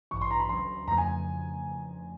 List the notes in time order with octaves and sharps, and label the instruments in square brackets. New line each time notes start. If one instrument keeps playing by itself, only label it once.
[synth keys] A1 G2 E3 [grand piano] C#6
[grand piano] C6
A#5
B5
[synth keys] D2 C#3 F#3 [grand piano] C6
[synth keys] F2 C#3 F3 A3 [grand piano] A#5
[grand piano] G#5